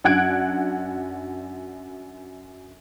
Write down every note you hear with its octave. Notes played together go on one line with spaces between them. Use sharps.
F#2 D4 F#5 F#6 G#6 D7